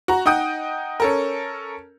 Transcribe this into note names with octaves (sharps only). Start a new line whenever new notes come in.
F#4 A#5
D#4 F#5 G5 D#6 G6
C#4 A4 A#4